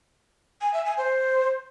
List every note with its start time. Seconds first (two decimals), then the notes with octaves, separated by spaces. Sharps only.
0.62 G#5
0.74 E5
0.85 G#5
0.97 C5